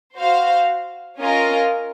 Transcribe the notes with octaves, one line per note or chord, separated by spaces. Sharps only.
F#4 C5 F5
C#4 F4 A#4 D#5